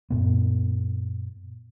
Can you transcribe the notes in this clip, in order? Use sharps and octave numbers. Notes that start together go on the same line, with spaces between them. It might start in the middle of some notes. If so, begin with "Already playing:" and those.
F#2 A#2 B3